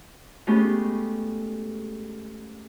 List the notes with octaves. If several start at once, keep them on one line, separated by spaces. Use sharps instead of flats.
G#3 A3 B3 C#4 G4